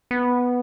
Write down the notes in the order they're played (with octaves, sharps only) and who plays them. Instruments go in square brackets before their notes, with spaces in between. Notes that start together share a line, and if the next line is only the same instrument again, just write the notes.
[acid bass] B3